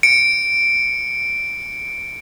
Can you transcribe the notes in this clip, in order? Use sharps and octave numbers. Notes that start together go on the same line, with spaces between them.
C#7 D7